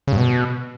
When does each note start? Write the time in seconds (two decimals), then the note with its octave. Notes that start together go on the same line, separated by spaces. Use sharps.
0.07 C#3
0.13 G2
0.18 B2